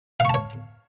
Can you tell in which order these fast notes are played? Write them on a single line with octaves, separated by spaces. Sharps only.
F5 C#6 A5 C#5